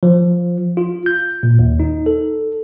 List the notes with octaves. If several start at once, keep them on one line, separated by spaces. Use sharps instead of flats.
F3
F4
G6
A#2
D#2
D#4
A4